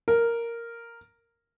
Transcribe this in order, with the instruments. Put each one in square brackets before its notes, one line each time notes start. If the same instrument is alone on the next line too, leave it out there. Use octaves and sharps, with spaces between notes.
[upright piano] A#4